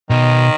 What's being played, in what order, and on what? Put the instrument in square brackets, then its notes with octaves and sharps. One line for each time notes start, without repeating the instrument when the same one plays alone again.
[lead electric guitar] B2 [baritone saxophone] D#3